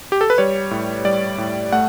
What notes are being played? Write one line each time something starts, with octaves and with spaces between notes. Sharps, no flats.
G4
A4
B4
G3 C#5
A2
G3 D5
A2
A3 F#5